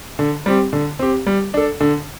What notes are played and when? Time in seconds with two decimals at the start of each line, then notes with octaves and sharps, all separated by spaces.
0.19 D3
0.46 G3 C4 G4
0.73 D3
0.99 C4 G4
1.27 G3
1.54 D4 A4
1.81 D3